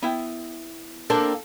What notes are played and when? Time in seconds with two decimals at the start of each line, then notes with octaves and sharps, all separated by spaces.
0.03 B3 E4 G5
1.10 A#3 C4 D4 A4